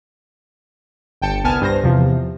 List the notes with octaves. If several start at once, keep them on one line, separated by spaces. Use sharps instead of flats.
G1 G5 A5 C#7
C2 B3 G#5 A5 F6
G2 C5 A#6
E2 C3 F3